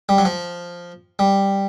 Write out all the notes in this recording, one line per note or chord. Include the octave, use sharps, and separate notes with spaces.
G3
F#3
F3
G3